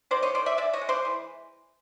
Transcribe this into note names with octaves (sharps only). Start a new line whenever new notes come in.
D#3 C5 D5
C#5 D#5
D#3 C5 D5
D5 E5
G#3 D5 E5
C#5 D#5
G#3
C5 D5
E3